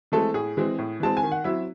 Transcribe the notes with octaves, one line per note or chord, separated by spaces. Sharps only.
E3 G#3 A3 C4 A4
A2 G#4
E3 G#3 C4
A2
E3 G#3 C4 A5
G#5
D#3
F#5
F#3 C4 E4 E5